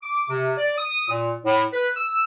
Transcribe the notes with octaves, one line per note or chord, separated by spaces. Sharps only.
D6
C3
D5
D#6
A#2
A2
B4
E6